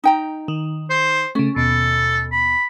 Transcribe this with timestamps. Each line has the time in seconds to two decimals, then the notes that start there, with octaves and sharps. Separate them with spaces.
0.04 D#4 G5 A#5
0.48 D#3
0.90 C5
1.35 C#3 A3 C#4
1.56 D#2 B2 A4
2.32 B5